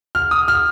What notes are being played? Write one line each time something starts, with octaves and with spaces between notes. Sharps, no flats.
F6
D#6
F6